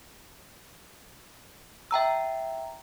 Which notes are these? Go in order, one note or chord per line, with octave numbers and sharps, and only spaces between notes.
E5 G5 A#5 E6